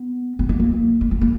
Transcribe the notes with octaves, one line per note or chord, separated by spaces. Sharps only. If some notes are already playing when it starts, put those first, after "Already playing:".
Already playing: B3
B3
A#3
A#3
A#3
A#3
A#3